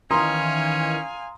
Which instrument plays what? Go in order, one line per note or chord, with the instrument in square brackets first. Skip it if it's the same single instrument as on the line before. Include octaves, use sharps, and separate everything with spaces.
[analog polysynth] D#3 E3 [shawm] C#4 [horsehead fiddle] F5 G#5 [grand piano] A#5 C6 D#6